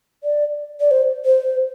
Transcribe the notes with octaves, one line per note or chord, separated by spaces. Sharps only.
D5
D5
C5
C5